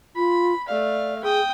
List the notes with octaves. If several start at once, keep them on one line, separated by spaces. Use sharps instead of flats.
F4 B5
A3 D5 F5
G#4 G5 D#6